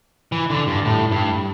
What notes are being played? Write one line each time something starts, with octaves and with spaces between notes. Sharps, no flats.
E3
D3
G2
A2
G2